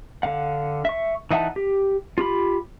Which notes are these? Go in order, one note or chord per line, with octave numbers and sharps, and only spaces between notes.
D3 F5 F#5
E5 C#6
E3 D#4 E5 F#5 A5
G4
F4 G4 B5